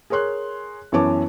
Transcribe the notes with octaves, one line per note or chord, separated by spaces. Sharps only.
G#4 A#4 C#5 C6 F#6
F#2 E3 B3 C#5 A5 D6